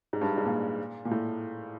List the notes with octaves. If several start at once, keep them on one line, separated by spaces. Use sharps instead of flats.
G#2
G2
G#2
A#2
A#2
A2